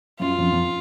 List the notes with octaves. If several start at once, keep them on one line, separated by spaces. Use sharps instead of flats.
F#2 F4
F2
F2